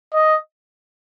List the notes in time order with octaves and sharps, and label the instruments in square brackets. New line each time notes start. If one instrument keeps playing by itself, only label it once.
[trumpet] D#5